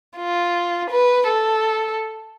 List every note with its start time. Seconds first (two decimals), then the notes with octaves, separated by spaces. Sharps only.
0.17 F4
0.90 B4
1.27 A4